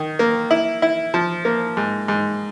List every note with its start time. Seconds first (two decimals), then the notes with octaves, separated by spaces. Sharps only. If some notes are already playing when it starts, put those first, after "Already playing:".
Already playing: D#3
0.19 A#3
0.51 E4
0.82 E4
1.14 F3
1.45 A#3
1.77 G#2
2.08 G#2